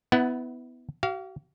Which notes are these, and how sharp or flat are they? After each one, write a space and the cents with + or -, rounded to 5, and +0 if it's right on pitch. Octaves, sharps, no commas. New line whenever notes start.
B3 +15 E4 -20 F#5 +0
F#4 +45 F5 -10